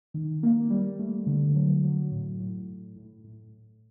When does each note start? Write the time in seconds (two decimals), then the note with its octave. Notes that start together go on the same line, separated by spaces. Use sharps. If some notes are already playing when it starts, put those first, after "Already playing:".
0.14 D#3
0.43 A#3
0.70 G3
0.99 A3
1.27 D3
1.55 F#3
1.83 F#3
2.12 A2
2.40 A2
2.68 A2
2.96 A2
3.24 A2